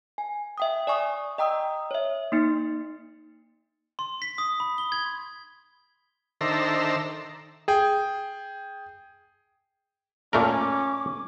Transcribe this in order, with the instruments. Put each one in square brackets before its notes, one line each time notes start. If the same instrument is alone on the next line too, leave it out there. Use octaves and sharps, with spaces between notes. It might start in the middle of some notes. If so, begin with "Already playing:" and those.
[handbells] G#5
E5 G5 D#6
D5 G#5 C#6 D#6
D#5 G5 A#5 D#6 E6
C#5 E5
A#3 D#4 C#7
[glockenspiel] C6
B6
D#6
B5
G7
G#6
[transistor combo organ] D#3 D4 A4 C5 E5 A#5
[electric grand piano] G#4 G5
[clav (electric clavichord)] A#2 A3 A#4 [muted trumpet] C#4 [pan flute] D6